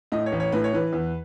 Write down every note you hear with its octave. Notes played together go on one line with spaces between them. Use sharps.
A2 D#5
C#5
A1
C#5
A2 B4
C#5
E3 B4
E2